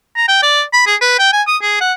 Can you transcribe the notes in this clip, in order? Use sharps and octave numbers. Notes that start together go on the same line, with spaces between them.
A#5
G5
D5
B5
G#4
B4
G5
G#5
D#6
G#4
F#5